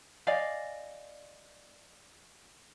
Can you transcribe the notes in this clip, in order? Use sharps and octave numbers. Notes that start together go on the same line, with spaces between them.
D5 D#5 F5 G#5